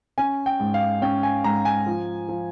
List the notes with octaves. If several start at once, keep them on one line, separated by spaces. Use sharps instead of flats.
C#4 G#5
G5
G#2
F5
C#4 G5
G#5
G#2 A#5
G#5
F3
F3